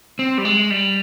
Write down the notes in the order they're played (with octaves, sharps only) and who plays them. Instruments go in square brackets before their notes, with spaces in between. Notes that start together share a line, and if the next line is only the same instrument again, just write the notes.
[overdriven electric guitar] C4
G3
G#3
G3